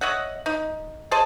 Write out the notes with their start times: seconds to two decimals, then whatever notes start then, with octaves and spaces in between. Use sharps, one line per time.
0.01 C#5 D#5 E5 F#5
0.46 D#4
1.11 G#4 C5 D#5 A5